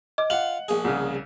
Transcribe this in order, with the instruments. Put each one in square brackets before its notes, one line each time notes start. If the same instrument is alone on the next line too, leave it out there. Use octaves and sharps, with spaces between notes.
[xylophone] D#5 [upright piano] D6
[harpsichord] F4 [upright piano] F#5 F#7
[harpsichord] A#1 G#4
[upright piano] C2 C#3